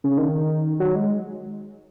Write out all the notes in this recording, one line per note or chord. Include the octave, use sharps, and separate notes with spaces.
C#3
D#3
F#3
G#3